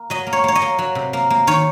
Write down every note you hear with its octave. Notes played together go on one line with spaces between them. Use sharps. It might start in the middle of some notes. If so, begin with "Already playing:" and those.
Already playing: A#3
F#3 D#5
A#3
C#5
A#3 C#5
D#5
A#3
F#3
C3
A#3
A#3
D#3 C#5